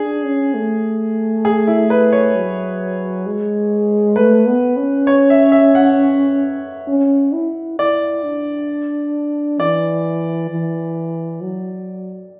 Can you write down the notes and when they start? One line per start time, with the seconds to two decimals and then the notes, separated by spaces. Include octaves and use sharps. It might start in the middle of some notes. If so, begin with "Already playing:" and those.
Already playing: D4 G#4
0.25 C#4
0.54 A3
1.45 G#4
1.67 E4
1.90 B4
2.12 C#5
2.35 F#3
3.26 G#3
4.16 A3 B4
4.47 B3
4.77 C#4
5.07 C#5
5.30 E5
5.52 E5
5.75 F#5
6.88 C#4
7.33 E4
7.79 E4 D5
8.24 D4
9.60 E3 D5
10.50 E3
11.41 F#3